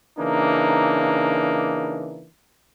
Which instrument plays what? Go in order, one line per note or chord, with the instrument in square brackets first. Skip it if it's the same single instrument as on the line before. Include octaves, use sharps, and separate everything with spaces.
[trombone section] C#3 E3 A#3 D4 D#4